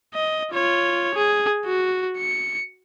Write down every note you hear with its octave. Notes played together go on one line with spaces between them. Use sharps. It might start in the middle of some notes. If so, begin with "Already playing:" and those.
D#5
F4 C#5
G#4
F#4
C#7